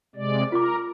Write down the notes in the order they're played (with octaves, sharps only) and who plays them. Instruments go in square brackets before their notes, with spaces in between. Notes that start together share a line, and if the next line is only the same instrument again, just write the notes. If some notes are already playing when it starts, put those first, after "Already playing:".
[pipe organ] C3 G#3 D5
[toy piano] F4 D6 [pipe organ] A#4